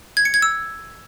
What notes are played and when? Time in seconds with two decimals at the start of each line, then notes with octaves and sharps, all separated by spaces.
0.17 G#6
0.25 C#7
0.34 G#6
0.42 E6